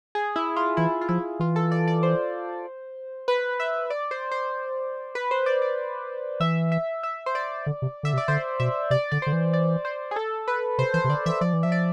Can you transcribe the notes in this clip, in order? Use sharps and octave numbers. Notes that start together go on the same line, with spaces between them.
G#4
E4
F4
E3 E4
F4
F3 E4
E3 F4
A4
D5
D5
C5
B4
E5
D5
C5
C5
B4
C5
D5
D5
E3 E5
E5
E5
C5
D5
D3
C3
D3 E5
C3
D5
D3 C5
B2 E5
C3 D5
D3 D5
D3 C5
E3
D5
C5
G#4
A4
B4
C3 C5
E3 C5
C3
D3 D5
E3 E5
F3 D5
E3
F3 E5
D5